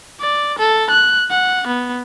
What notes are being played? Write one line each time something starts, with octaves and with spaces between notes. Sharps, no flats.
D5
A4
F#6
F#5
B3